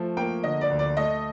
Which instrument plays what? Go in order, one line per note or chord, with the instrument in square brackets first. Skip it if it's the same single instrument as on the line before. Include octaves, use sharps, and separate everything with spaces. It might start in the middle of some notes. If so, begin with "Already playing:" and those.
Already playing: [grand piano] F3 A3
[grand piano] A#3 [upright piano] G5
[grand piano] D3 [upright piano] D#5
[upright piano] D5
[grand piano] D2
[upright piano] D5
[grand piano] A3 [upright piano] D#5